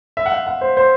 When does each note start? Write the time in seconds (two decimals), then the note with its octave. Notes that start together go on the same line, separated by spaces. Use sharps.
0.17 E5
0.26 F#5
0.32 F5
0.47 F#5
0.61 C5
0.77 C5